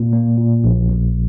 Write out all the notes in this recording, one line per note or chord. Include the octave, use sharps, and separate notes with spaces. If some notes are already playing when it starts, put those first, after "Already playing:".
Already playing: A#2 A#3
A#3
A#2
A#1
A#1